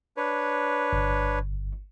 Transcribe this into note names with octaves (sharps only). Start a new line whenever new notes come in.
D4 B4 C#5
G1